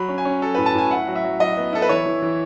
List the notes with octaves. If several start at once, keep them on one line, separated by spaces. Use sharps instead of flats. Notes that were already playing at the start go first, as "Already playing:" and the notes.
Already playing: F#3 B5
C#4
G#5
C#4
F#3 A4
A2 B4
A5
A2 G#5
E4 F#5
F#3
E5
F#3
F#3 D#5
B3
E4 A4
B4
E3 C#5
E3
E3